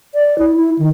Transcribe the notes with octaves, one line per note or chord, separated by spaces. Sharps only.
D5
E4
E4
D#3